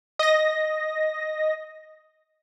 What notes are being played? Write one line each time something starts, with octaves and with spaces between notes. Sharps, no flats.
D#5 A#6